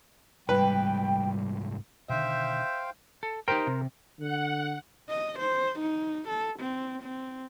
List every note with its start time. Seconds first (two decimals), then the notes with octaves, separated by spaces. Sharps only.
0.49 C2 G#2 G3 B4 G5
2.10 B2 D3 D#3 C5 E5 F5 G5
3.23 A4
3.48 D#4 G4 A#4 C5 G5
3.67 C3
4.20 D3 F#5
5.09 D#5
5.39 C5
5.79 D#4
6.28 A4
6.60 C4
7.03 C4